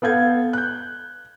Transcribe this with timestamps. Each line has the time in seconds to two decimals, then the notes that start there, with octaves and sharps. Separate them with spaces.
0.02 B3 A4 F5 G6 G#6
0.53 F#6 G6